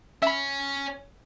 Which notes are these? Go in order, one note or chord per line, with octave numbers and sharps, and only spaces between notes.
C#4 E5 B5